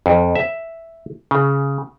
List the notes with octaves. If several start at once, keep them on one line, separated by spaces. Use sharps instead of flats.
F2
E5
C#3